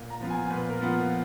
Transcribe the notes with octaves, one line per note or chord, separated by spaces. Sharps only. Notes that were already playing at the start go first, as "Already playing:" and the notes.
Already playing: A#2
A#5
F3 B3 F4
G#5
A#2 B4
A#4
F3 B3 F4